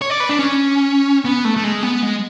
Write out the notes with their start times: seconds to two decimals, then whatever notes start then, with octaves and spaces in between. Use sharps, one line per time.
0.02 C#5
0.10 D5
0.20 B4
0.29 D4
0.39 C#4
1.25 B3
1.45 A3
1.57 A3
1.64 G#3
1.83 B3
2.02 G#3